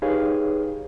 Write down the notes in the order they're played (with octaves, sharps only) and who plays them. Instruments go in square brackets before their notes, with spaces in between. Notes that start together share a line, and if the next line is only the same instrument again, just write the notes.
[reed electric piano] D#4 G4 G#4 B4 C#5 F5